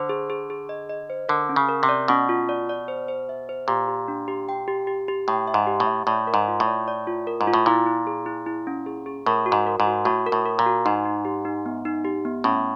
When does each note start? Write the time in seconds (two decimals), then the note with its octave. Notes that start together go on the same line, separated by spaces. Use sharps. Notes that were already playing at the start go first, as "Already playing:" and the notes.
Already playing: D3 C5
0.09 G#4
0.30 G#4
0.50 G#4
0.69 D#5
0.89 D#5
1.10 C5
1.29 D3 A#4
1.49 C#4
1.56 C#3
1.69 A#4
1.83 C3
1.89 D5
2.08 B2 C#4
2.29 F4
2.49 D5
2.69 D5
2.88 C5
3.08 C5
3.29 E5
3.49 C5
3.68 A#2 G4
3.88 G4
4.08 D4
4.28 G4
4.49 G5
4.68 G4
4.87 G4
5.08 G4
5.28 A2 G5
5.47 E5
5.54 G#2
5.67 G4
5.80 A2
5.87 E5
6.07 A2 D5
6.27 A#4
6.34 G#2
6.48 F4
6.60 A2
6.67 D5
6.88 D5
7.07 F4
7.27 A#4
7.41 G#2
7.47 F4
7.54 A2
7.66 A#2 E4
7.86 E4
8.07 G#4
8.26 E4
8.46 E4
8.67 C#4
8.86 G#4
9.06 G#4
9.26 A2 A#4
9.46 F#4
9.52 G#2
9.67 A#4
9.80 G#2
9.86 F#4
10.05 A2 F#4
10.26 A#4
10.32 A2
10.46 A#4
10.59 A#2
10.66 F#4
10.86 G#2 D#4
11.05 D#4
11.25 G4
11.45 D#4
11.66 B3
11.85 D#4
12.05 G4
12.25 B3
12.44 A2 C#4